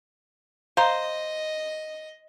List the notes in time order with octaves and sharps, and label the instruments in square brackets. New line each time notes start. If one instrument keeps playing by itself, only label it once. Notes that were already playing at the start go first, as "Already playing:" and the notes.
[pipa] C5 [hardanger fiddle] D#5 [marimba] F5 A#5